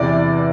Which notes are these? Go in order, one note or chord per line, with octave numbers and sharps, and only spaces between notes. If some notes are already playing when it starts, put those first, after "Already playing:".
Already playing: E2 C3 E3 D5